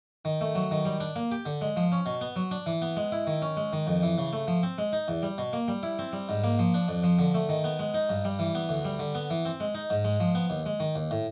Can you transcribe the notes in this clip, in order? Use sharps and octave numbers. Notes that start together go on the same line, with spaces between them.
D#3
A3
F#3
D#3
G3
D4
A#3
G4
D3
G#3
F3
C#4
B2
B3
F#3
D4
E3
B3
G#3
E4
D#3
C#4
G#3
D#3
F2
E3
C#3
A3
F3
C4
G#3
D#4
E2
G3
B2
A#3
G3
E4
C4
G3
G#2
A#3
F3
D4
F2
F3
D3
A3
D#3
B3
G#3
D#4
G2
G3
E3
B3
D2
G3
D3
B3
E3
C4
G#3
D#4
G#2
G#3
F3
B3
D#2
G#3
D#3
D#2
A2